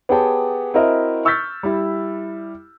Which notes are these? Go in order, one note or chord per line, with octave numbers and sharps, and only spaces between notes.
B3 G4 G#4 C#5 G5 A5
C4 E4 F#4 A#4 D#5 E5
C#6 E6 F6 G6 A6 B6
G3 E4